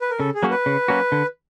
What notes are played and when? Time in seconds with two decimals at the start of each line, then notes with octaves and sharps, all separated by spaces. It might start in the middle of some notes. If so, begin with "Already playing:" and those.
0.01 B4
0.10 A#4
0.19 C#3 A4
0.35 G#4
0.43 F#3 A#3 C#4 F#4
0.51 B4
0.66 C#3
0.88 F#3 A#3 C#4 F#4
1.12 D3